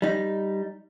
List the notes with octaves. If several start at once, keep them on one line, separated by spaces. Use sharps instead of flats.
G3 D#4